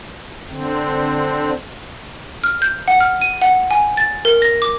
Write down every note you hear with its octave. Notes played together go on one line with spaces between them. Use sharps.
D3 C4
F6
G6
F#5
F6
D#7
F#5
G#5
A6
A#4
A#6
D6